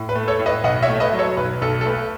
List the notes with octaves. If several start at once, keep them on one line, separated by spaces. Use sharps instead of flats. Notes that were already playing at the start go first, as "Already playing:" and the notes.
Already playing: A2
B4
A3
A4 C#5
A2
B4 D#5
B1 D#5 F#5
C#5 E5
A3
B4 D#5
F#3
A4 C#5
B1 B4
B1 A4
A4
A3 B4